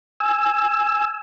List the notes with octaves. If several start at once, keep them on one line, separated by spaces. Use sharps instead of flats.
G#5 E6